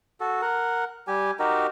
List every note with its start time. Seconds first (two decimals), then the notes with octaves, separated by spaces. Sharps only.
0.20 F#4 A4
0.42 A#4 F#5
1.08 G3 G4 G#5
1.39 D#4 F#4 G4 A#4